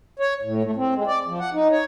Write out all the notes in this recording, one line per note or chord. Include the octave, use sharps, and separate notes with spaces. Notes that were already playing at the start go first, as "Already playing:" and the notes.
C#5
A2
A3
C4
G#3
D5
F3
F#5
D#4
C#5